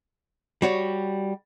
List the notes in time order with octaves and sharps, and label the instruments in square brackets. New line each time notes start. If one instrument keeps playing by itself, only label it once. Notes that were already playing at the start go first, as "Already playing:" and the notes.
[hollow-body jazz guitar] G3 F#4 C#5